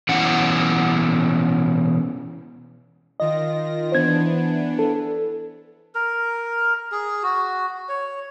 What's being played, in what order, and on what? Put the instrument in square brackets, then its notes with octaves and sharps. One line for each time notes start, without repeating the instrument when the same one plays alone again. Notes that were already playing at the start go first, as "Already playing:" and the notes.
[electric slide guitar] B2 E3 C#4 E4 F#5
[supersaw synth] D#3 F4 A#6 [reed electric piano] D#5
[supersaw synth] E3 B3 D4 [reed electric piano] C5 G#6
[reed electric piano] A4
[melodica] A#4
G#4
F#4
C#5